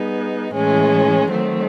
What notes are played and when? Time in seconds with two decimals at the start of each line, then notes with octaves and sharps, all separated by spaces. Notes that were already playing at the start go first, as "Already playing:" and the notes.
Already playing: G3 B3 D#4 G#4
0.53 A2 E3 G#3 C#4
1.30 D#3 F#3 A3 C4